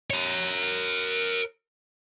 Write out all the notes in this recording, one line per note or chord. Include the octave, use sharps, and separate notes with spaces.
A#4 C#5